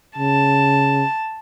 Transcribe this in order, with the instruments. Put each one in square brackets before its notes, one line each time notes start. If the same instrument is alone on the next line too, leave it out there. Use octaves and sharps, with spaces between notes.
[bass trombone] C#3 [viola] A5